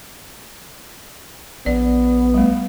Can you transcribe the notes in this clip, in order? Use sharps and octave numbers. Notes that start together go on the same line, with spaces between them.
A#1 B3 D5
G3 A3